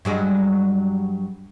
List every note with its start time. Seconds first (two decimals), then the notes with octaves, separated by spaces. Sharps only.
0.05 G2 F#3 G#3